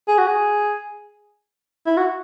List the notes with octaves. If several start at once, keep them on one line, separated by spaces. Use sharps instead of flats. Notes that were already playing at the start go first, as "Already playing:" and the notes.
G#4
F#4
G#4
E4
F#4